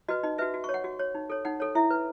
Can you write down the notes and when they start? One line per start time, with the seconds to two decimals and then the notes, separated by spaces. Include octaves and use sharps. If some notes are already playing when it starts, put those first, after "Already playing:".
0.08 F#4 B4 D#5
0.23 D#4 D#5
0.38 F#4 B4 E5
0.54 F#4
0.64 C#6
0.69 C#5
0.74 F#5
0.84 F#4
0.99 C#5
1.15 D#4
1.30 A4 C#5
1.45 D#4 F#5
1.60 A4 C#5
1.75 E4 E5
1.91 B4